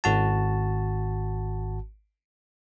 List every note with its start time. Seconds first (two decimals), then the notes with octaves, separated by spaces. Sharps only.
0.04 G#1 F#4 A5